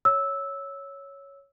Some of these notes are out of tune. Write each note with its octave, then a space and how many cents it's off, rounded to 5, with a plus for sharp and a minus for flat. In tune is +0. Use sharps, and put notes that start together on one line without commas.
C#5 +0 E6 -10